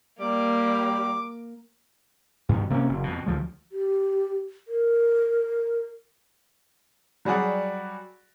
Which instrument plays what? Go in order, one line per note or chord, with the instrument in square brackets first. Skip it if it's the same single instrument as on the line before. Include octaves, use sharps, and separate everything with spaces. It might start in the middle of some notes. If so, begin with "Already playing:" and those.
[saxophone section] G3 [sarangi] A#3 [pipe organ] D6
[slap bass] G2 B2 D#3
C3 A#3 B3 C#4
F#1
F2 B2
D2 F3 G#3
[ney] G4
A#4
[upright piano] F#3 G3 F#4 G#4 D5 F#5